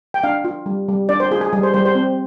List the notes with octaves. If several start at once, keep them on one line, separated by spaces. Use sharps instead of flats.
G5
D4 F5
F4
G3
G3
D4 D5
C5
F4 G#4
G#4
G3 G#4
C5
G3 C5
C5
C4